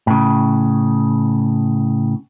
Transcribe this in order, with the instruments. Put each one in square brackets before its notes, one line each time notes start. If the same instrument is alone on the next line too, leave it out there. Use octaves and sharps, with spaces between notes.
[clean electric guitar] A2 C#3